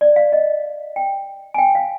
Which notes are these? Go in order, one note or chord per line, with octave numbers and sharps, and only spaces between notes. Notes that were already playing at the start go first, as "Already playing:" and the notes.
D5
F5
D#5
G5
G#5
G5
F5